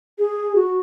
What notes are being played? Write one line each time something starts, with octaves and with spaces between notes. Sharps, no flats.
G#4
F#4